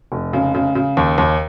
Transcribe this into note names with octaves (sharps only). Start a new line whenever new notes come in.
F1
C#3
C#3
C#3
D#2
D#2